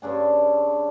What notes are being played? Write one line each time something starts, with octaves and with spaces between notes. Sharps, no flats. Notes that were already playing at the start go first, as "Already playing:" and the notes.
G2 C#3 D4 G#5